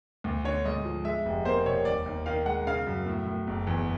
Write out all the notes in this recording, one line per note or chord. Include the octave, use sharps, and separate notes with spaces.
D2
D3 C#5
G#2 D#5
F3
G#3 E5
F1
A#3 C5
C3 C#5
D#2 D5
D#2
D#3 F5
G#3 F#5
C#3 F5
F#2
A2
A2
F#1
E2